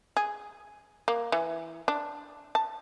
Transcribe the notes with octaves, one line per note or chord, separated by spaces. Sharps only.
G#4
A#3
E3
D4
A5